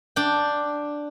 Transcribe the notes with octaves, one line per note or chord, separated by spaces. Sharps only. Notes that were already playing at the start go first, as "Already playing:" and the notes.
D4 G5